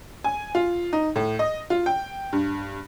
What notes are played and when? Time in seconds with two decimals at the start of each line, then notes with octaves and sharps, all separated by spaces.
0.24 G#5
0.55 F4
0.93 D#4
1.16 A2
1.39 D#5
1.70 F4
1.86 G5
2.33 G2